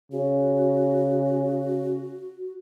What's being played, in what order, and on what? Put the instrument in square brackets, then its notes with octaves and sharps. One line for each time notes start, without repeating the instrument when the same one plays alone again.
[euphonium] C#3 [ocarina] F#4